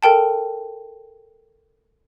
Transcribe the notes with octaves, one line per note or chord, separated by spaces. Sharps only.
A4 A#4 G5 A5